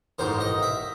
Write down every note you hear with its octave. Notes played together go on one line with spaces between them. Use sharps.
A1 G#2 D#3 C5
D#5
E5